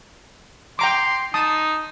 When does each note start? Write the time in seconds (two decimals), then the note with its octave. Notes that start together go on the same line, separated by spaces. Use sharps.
0.79 G5 A#5 C6 D6
1.34 D#4 A5 D#6